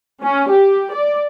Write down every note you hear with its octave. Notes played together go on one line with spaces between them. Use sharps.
C#4
G4
D5